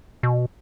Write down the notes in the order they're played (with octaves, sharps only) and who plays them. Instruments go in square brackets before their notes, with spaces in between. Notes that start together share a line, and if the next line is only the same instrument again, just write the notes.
[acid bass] B2